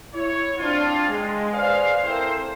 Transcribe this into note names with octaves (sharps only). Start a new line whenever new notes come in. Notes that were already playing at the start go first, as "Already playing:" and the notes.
E4 C#5
C4 D4 F4
G#3
G#4 B4 C5 D5 F5
C4 E4 A4 A#4 C5